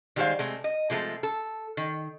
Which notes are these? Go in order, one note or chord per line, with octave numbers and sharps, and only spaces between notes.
D#3 G3 G#3 F#4 C5 F5
C3 G#3 A3
D#5
C3 F3 G#3 A3
A4
D#3